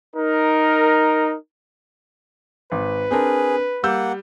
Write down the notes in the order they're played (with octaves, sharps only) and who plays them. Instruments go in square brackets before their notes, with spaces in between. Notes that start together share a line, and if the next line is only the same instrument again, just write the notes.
[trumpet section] D#4 A#4
[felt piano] G#1 [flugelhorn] B4
[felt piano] C4 D4 A#4 [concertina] G#4
[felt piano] G3 E6 G6 [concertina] A#3 F#5